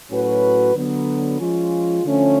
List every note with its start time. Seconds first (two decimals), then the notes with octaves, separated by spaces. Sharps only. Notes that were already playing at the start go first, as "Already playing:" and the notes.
0.10 A2 F#3 C#4 F#4 B4
0.75 D3 F#3 B3
1.39 F3 G#3 C#4 F4
2.04 D3 F3 A3 C#4